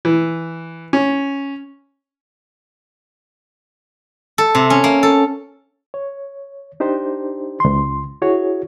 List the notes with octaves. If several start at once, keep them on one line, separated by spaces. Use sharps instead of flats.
E3
C#4
A4
C3
C#4
A#3
A4
C#5
D4 D#4 G4 C5
C#2 C6
E4 F#4 G#4 C#5